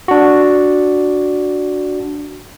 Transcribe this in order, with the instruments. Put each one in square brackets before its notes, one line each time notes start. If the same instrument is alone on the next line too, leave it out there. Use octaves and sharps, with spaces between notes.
[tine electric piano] D4 F#4